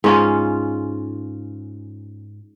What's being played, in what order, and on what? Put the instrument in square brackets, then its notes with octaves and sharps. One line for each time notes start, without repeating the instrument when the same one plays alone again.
[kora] G#2 C#4 F4